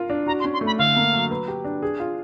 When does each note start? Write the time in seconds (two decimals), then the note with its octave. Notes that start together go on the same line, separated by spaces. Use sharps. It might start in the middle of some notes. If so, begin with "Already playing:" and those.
Already playing: F4 A#4
0.10 D4
0.26 F#4 A#5
0.40 C6
0.45 C#4
0.53 C6
0.61 A3
0.66 B5
0.78 D3 F5
0.96 A#3
1.13 F#3
1.31 B4
1.48 G4
1.65 D4
1.82 G#4
2.00 F4